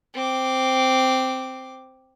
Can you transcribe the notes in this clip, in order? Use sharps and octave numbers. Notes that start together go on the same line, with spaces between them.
C4 D6